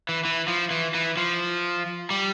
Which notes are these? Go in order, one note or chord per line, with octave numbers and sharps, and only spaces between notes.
E3
E3
F3
E3
E3
F3
G3